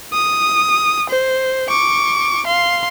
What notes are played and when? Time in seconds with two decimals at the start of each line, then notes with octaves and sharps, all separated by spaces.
0.13 D#6
1.10 C5
1.69 C#6 D6
2.46 F5 C6